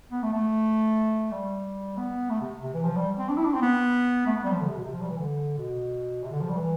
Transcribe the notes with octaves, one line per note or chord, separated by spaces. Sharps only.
B3
A3
A3
G3
B3
A3
C3
C3
E3
F3
G3
C4
D4
E4
D4
C4
B3
A3
B3
G3
F3
D3
C3
B2
C3
F3
G3
E3
D3
B2
C3
D3
F3
G3
E3